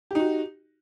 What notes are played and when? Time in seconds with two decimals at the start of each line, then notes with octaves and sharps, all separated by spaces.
0.11 G4
0.15 D#4
0.20 F#4